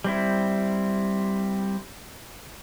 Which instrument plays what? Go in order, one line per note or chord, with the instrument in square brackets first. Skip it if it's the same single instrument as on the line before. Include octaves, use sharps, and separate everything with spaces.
[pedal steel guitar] G3 C4 E4